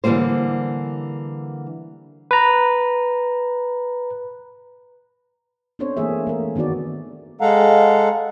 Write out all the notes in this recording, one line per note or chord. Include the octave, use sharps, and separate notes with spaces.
D3 E3 F3 G3 A#3 C5
B4 A#5
B3 C4 D4 A4 C5 C#5
E3 A3 A#3 D4 G#4 E5
A3 A#4
D#3 B3 D#4 F#4 D5
G#3 A4 F5 F#5 A#5